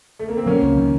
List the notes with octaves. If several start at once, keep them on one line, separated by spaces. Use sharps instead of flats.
A3
A#3
C4
F#3 A#3 C#4
C#2
D#3